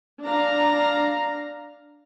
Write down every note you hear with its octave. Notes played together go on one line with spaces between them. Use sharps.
D4 F5 A#5